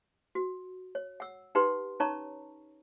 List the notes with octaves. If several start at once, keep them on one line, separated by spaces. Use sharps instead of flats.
F#4
C#5
F#5 E6
D#4 G4 B4 F#5 C6
C#4 D#4 C#5 A5 A#5 C#6